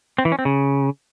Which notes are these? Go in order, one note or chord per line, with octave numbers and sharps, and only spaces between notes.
C4
E3
C#4
C4
C#3